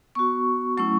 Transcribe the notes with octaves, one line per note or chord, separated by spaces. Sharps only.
B3 F#4 C#6
F#3 A3 C#4 E4 C#6